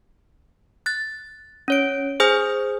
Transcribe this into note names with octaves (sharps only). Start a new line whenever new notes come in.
F#6 A6
C#4 C#5 D7
G#4 C5 G#5 D#6 F6 G6